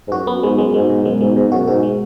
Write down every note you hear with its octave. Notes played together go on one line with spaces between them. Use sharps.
G#2
F#2 F#4
F#2 B3
G#2 G#3
F#2 G#3
G#2 G#3
B2
F#2 G#3
G#2 G#3
G#2 B2
F#2 F#4
G#2 F#4
G#3